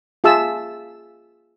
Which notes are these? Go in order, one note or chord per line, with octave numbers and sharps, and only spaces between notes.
F4 G#4 E5 A5 E6